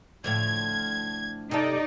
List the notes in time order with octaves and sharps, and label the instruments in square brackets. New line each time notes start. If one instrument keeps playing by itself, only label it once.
[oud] A2 D3 F3 [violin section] G#6
[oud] C3 A4 [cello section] D#4 D5